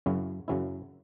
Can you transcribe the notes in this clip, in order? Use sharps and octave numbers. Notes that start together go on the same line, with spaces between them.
F#2 C#3 F#3 C#4 E4
F#2 C#3 F#3 C#4 E4